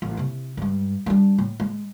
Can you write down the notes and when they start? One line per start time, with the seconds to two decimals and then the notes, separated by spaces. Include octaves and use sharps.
0.02 A1
0.17 C3 E4
0.57 G2 G#3
1.06 G3 D4
1.38 A2
1.60 G#3